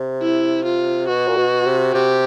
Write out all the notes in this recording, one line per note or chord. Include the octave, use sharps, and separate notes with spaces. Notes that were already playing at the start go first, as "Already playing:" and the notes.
Already playing: C3
E4
F4
B2 F#4
A#2
B2
C3
C3 G4